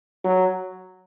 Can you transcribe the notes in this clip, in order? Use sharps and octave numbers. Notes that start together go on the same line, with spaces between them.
F#3